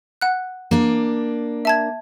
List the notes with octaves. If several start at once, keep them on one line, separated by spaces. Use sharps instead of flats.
F#5 F#6
A#3 D4
E5 A5 G#6